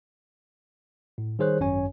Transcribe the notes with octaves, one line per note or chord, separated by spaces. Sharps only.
A2
D#3 G3 G#4 C5 C#5 F#6
G#1 F#2 C#4 C#5 G#5